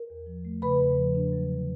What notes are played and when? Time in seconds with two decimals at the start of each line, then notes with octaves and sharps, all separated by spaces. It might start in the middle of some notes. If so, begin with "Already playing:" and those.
Already playing: A#4
0.10 E2
0.26 F3
0.45 A3
0.62 C#3 B4 B5
0.80 E2
0.97 F3
1.15 D4
1.33 F#3
1.51 D3